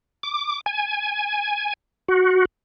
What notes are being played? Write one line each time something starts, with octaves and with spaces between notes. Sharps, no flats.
D6
G#5
F#4